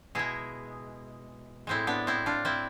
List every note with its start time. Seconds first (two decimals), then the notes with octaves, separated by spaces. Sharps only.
0.15 B2 G#3 E4 G#4
1.67 A2 G#3 C4 E4
1.87 B3 D4
2.07 C4 E4
2.26 D4 F4
2.45 C4 E4